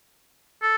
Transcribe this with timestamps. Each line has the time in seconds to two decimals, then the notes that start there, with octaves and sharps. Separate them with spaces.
0.62 A4